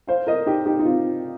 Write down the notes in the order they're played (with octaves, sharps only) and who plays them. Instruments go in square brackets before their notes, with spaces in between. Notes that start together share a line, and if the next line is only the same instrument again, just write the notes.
[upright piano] C5 F5
A#4 D#5
D#4 G4
D#4 G4
D#4
C4 F4